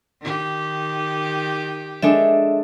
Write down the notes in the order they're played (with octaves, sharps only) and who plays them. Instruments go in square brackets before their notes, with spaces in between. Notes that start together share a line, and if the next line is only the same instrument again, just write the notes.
[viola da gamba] D#3 G4
[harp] G#3 D4 A4 [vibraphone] E5